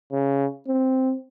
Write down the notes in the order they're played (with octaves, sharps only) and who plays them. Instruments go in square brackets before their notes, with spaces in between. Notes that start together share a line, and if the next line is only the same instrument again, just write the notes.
[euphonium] C#3
C4